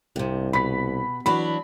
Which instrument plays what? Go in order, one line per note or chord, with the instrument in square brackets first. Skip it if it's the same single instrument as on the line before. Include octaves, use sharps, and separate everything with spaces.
[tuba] C2 [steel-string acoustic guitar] G2 C3
[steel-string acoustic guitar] B2 [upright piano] B5 B6
[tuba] E3 [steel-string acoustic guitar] F#3 D4 F#4 [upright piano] B5